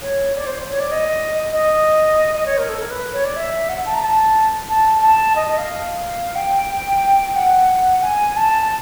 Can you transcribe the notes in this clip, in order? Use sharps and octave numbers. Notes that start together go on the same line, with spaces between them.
C#5
D5
C5
C#5
D5
D#5
D#5
D#5
C#5
A#4
A4
A#4
B4
C#5
D5
E5
F#5
A5
A#5
A5
A5
A5
D#5
D#5
F5
G5
F#5
G#5
A5